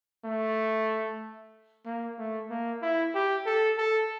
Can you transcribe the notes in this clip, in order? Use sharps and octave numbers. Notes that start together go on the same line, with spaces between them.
A3
A#3
A3
A#3
E4
G4
A4
A4